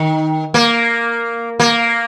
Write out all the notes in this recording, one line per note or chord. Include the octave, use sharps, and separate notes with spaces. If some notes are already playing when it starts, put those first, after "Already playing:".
Already playing: D#3
A#3
A#3